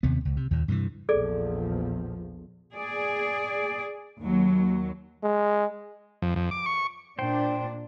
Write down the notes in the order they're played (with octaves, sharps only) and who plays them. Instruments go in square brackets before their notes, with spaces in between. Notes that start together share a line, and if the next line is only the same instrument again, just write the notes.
[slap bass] D#2 C3 B3
C#2
C3
D#2 A#2
G2 C3 D#3 E3
[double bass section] A#1 E2 F3 [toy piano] G#4 A4 D5
[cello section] G#4 D5
D#2 F#3
[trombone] G#3
[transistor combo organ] F2
F2
D6
C#6
[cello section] A#2 D4 [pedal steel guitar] C5 G5